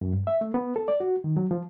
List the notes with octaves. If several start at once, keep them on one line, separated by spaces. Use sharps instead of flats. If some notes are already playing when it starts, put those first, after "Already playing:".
F#2
G2
E5
A3
B3
A4
D5
F#4
D#3
F#3
F3